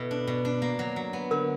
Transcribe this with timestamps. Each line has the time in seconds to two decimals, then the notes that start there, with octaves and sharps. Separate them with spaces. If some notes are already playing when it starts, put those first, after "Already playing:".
Already playing: B2 B3 E4 A4
0.11 D4
0.27 B2
0.45 D4
0.62 A#3
0.79 F#3
0.96 F#3
1.13 B3
1.31 D3 A#4